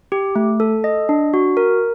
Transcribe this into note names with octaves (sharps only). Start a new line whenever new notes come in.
G4
A3
A4
D#5
D4
F#4
A#4